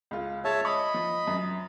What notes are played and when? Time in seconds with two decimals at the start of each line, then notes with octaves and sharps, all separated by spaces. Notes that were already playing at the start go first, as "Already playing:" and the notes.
0.11 C#2 F4
0.45 G#3 C#5 E5 A5
0.65 D#5 B5 C#6
0.94 F3
1.27 F#2